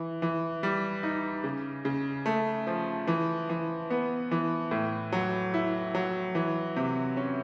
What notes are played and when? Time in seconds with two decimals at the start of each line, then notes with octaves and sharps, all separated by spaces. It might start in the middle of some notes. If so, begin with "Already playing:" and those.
Already playing: E3
0.22 E3
0.63 G3
1.03 D#4
1.44 C#3
1.85 C#3
2.26 A3
2.67 F3
3.07 E3
3.50 E3
3.90 B3
4.31 E3
4.71 A2
5.12 F#3
5.54 E4
5.95 F#3
6.35 E3
6.76 C3
7.17 C#4